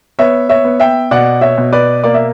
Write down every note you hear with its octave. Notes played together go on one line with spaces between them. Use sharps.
B3 C#5 E5
C#5 E5
B3
E5 G5
B2 D5 F#5
C#5 E5
B2
B4 D5
A#3 D5
E5